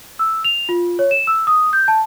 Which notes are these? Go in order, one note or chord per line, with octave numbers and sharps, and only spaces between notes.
E6
F7
F4
C#5
E7
E6
D#6
G6
A5